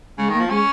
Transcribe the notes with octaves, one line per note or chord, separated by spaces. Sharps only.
C#3 G#3
D#3 A#3
F3
G#3 C#4